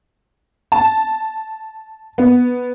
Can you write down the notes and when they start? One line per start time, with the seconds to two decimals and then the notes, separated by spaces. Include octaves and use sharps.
0.72 A5
2.18 B3